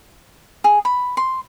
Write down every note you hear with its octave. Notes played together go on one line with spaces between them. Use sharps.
G#4
B5
C6